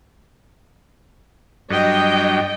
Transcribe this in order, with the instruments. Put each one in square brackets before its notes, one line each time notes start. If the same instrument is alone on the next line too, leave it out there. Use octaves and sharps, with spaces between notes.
[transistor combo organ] G2 F#3 [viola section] D#5 G5